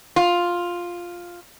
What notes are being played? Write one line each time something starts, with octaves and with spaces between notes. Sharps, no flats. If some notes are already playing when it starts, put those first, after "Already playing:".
F4